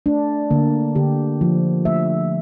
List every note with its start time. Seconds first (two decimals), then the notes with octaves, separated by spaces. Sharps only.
0.06 A3 D4
0.50 D3 A#3
0.95 D3 G4
1.41 F3
1.85 A3 E5